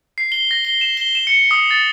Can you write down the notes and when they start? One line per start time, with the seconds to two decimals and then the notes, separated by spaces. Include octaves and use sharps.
0.18 C7
0.32 G7
0.51 A#6
0.65 G7
0.81 E7
0.97 G7
1.15 E7
1.27 C#7
1.51 D#6
1.71 A6